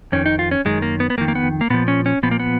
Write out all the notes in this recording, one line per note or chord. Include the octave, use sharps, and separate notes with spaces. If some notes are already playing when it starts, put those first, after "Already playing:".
F2 D#3 C#4
D#4
F4
C#4
F#2 D#3 G#3
A#3
B3
B3
F2 D#3 A#3
A#3
B3
A#3
A#2 F3 B3
C#4
C#4
A#2 F3 B3
A#3
B3